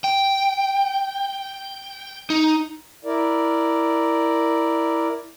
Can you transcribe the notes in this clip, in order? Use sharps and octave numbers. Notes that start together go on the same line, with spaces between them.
G5
D#4
E4 A#4 D5